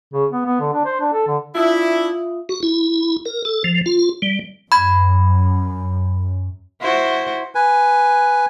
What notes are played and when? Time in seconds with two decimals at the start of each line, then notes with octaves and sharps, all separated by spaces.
0.13 C#3
0.32 B3
0.46 B3
0.60 D3
0.74 D4
0.85 C5
1.00 D4
1.13 A4
1.28 D3
1.55 D4 E4 F4 E5 D#6
2.49 F#4
2.63 E4
3.25 A#4
3.45 A4
3.64 F3
3.86 F4
4.22 G3
4.72 F#2 B5 G#6
6.81 E4 F#4 C5
7.55 B4 G#5